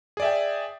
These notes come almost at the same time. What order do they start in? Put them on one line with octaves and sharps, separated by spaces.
G#4 D5 E5 G5